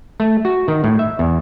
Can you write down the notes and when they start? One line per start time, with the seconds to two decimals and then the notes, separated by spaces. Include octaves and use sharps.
0.20 A3
0.45 F#4
0.68 D#3
0.84 A2
0.99 E5
1.19 E2